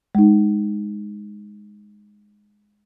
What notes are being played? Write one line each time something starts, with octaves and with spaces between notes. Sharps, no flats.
G#3 D#4